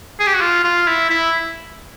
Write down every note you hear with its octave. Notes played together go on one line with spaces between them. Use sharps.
G#4
G4
F#4
F4
F4
E4
E4